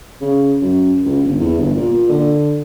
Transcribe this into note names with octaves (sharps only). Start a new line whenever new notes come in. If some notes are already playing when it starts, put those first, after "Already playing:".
C#3
F#2
C#2
G1
E2
G1
A#2
D3